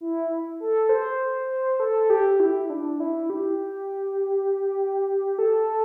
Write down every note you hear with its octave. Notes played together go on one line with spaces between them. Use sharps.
E4
A4
C5
A4
G4
E4
D4
E4
G4
A4